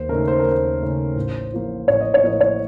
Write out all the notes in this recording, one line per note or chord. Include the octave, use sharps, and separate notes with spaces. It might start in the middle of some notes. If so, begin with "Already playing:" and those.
Already playing: D#2 C5
C#3 A3 D#4 A#4
C5
A#4
D#2
C5
C#3 A3 D#4
A1
A2 F3 A#3
A1 C#5
D#5
C#5
A2 F3 A#3 D#5
C#5